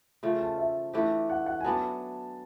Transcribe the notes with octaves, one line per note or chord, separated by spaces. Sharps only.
C#3 F3 A3
A5
E5
E3 A3 D4 G4
F#5
F#5
G#5
F#3 B3 D4 A5